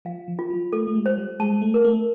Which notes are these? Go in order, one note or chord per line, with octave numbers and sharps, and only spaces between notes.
F3 F5
F3
F4
F#3
A3 A4
A3
G#3
C5
G3
G#3 A5
A3
A#4
A3